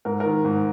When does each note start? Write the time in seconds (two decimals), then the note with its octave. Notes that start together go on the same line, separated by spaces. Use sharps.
0.05 G#2 A#4
0.20 D#3 A#4
0.45 G#2